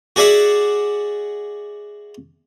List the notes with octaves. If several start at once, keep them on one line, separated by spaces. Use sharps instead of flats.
F#4 G#4 D5 E5 F#5